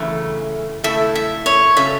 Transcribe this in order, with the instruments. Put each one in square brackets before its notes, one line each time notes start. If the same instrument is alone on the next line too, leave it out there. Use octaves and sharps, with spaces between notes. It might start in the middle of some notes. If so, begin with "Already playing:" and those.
Already playing: [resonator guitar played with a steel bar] F#2 C#3 E3 A3
[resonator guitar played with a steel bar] C#3 A3 E4 A4 [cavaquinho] E5
[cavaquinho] E5
C#5
[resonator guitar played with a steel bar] C#3 F#3 C#4 A4 [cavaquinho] E5